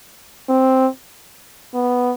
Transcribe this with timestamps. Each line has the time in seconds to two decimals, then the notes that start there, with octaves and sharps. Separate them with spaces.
0.49 C4
1.75 B3